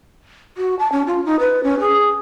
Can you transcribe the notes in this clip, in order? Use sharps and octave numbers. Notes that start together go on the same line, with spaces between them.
F#4
A5
C#4
F4
D#4
B4
C#4
G#4